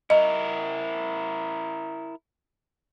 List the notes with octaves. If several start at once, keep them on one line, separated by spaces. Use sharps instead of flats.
E4 A#4 D#5